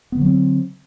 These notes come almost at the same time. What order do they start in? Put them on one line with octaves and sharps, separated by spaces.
B3 D3 F#3 C4